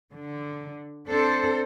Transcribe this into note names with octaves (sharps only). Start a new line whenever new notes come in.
D3
C4 D4 A4 C5